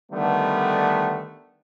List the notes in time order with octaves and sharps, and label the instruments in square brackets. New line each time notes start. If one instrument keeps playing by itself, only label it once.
[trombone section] D3 D#3 G3 A3 B3